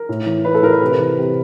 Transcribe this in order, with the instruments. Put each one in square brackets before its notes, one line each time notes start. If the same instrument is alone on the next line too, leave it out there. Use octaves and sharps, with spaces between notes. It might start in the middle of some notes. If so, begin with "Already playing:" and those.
Already playing: [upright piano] A#4
A2
E3
A2 B4
A4
E3 A#4
B4
C3
E3
C3